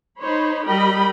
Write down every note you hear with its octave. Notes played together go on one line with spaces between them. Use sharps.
D#4 C5 C#5 B5
G3 A#4 D#5 G5 B5